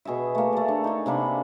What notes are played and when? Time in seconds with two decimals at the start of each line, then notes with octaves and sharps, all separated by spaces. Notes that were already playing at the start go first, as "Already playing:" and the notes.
0.05 B2 G#4 D#5 E5
0.35 A3 A#3
0.53 A3 D5
0.68 D4
0.84 D#4 G#4
1.06 C3 A#3 D4 B5